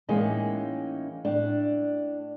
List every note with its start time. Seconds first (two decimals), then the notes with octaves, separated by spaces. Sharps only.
0.09 A2 E3 G#3 A#3 C#4 D#4
1.25 A2 D4